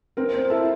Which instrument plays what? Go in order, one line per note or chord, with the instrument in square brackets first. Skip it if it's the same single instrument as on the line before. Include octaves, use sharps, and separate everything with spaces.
[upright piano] C4 [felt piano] A#4
[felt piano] C5
[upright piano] E4 [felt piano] A4